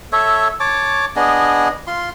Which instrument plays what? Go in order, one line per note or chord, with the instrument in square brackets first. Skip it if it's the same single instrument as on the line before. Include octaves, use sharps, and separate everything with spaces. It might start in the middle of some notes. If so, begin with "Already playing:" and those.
[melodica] A4 C#5 E5
C#5 A5 D6
B3 D4 G#4 D#5
F4 C6